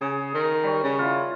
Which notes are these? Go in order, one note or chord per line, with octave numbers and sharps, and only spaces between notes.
C#3 G#4
D#3
G3 C#5
C#3
E4 F4